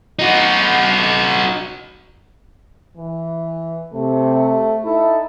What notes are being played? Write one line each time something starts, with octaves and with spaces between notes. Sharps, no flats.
D#4 F#4
E3
C3 A3
D#4 E4 A4